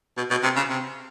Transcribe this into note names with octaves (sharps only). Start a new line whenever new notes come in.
B2
B2
C3
C#3
C3